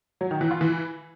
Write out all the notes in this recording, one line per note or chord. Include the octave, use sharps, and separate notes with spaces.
F#3
D#3
E3
F4
E3